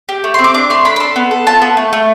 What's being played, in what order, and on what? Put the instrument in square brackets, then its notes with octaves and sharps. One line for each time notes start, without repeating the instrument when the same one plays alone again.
[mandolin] G4
A3
C4 C6
D6
D4 D6
A3 C6
D4 B5
B5
A4 C6
B3
A4
F4 A5
B3
A3
A3